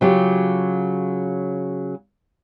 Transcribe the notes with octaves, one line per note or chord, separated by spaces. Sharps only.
C#3 F#3 F4 G4